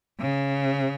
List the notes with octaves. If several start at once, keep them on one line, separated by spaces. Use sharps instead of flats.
C#3